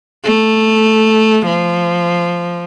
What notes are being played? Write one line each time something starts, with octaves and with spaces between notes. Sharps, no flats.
A3
F3